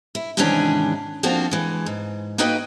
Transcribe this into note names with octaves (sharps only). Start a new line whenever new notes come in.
E4
G#2 C3 D#3 E3 C#4 D4
F3 A#3 C4 D4 F4 F#4
E3 G#3
G#2
A#3 D#4 F#4 B4 D#5 G5